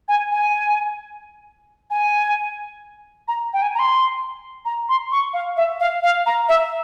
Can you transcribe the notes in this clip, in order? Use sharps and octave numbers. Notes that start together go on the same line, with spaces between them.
G#5
G#5
G#5
A#5
G5
G#5
A#5
C6
A#5
C6
C#6
F5
E5
F5
F5
A#5
E5